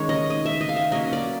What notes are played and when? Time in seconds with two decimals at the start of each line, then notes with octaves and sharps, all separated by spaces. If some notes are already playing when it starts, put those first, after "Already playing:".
Already playing: D#3 G#3 C#4 C#5
0.09 D#5
0.30 D#5
0.46 E5
0.61 D#5
0.69 F5
0.77 E5
0.92 F#3 A#3 C#4 D#5
1.13 D5